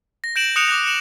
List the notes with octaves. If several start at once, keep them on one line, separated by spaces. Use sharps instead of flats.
A#6
G6 A#6 D7 E7 F#7
D#6 F#6 C#7 D7 E7 F7
D6 F#6 A#6
C#7 E7 F#7